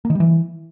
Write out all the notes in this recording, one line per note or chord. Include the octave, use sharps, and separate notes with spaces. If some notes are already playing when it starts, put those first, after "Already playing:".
A#3
D#3
G3
E3